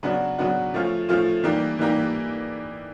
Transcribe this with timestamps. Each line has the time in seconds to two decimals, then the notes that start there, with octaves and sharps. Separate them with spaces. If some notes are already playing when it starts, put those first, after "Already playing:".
0.03 C#3 F#3 B3 D4 F#4
0.38 C#3 F#3 B3 D4 F#4
0.74 F3 A3 C#4 F4
1.09 F3 A3 C#4 F4
1.43 E3 G3 A#3 D#4 G4
1.79 E3 G3 A#3 D#4 G4